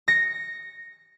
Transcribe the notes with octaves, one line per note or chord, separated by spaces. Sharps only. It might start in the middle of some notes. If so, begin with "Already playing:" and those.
A#6 C#7